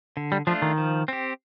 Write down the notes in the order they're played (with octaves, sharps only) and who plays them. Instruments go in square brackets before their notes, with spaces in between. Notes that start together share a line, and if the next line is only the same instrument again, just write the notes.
[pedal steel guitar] D3
[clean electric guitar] G3
[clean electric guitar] F3 [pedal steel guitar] A3 D4 F4
[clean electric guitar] D#3
[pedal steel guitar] F3
C4 G4